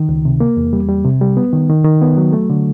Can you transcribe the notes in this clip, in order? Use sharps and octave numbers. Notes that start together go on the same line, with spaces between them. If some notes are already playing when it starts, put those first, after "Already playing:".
Already playing: D#3
C#2
C3
A#3
E2
G3
G3
C3
G3
B3
D#3
D#3
D#3
B3
F#3
A3
D3